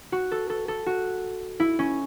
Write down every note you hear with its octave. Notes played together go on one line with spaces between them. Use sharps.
F#4
A4
A4
A4
F#4
E4
C#4